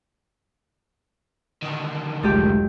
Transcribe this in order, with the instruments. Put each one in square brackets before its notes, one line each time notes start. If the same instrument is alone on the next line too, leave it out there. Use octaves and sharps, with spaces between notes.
[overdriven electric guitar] D3 D#3
[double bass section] F1 F#3 [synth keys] C#2 G#3 A3 [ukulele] F4 G4